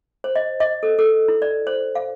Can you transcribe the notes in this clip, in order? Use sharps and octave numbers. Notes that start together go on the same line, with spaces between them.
C5
D#5
D#5
A4
A4
E4
D5
C5
F5